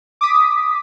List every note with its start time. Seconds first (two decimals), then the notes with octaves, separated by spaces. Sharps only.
0.21 D6 D#6 B6